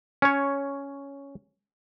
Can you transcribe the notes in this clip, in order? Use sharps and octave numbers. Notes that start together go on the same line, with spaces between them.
C#4 C#5